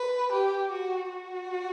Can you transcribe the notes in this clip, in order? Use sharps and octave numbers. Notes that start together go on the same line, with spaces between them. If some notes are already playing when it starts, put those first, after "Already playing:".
Already playing: B4
G4
F#4
F#4